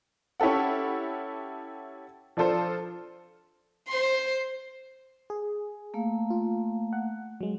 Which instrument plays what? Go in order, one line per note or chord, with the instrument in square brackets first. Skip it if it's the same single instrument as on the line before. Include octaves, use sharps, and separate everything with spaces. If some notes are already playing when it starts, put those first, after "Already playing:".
[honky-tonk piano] C#4 E4 G4 A4 F#5
F3 D4 F4 A4 C5
[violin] C5 C6
[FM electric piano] G#4
[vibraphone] A3 A#3 F5
[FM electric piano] F4
F#5
F#3 G#3